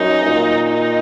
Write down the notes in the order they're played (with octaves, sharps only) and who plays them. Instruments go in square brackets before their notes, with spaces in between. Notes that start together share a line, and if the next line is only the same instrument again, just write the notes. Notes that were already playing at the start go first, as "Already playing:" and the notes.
Already playing: [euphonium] F#2 [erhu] D#4
[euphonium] A#2
[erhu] D#4